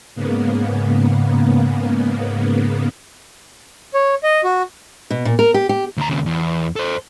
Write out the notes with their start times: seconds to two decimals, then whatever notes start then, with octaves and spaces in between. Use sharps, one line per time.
0.15 G#2 C#3 A#3 B3
3.94 C#5
4.23 D#5
4.44 F#4
5.10 B2
5.25 A#2
5.39 A#4
5.54 G4
5.69 G4
5.97 D2 A#5
6.09 D#2 C#3
6.26 E2
6.76 A4 C5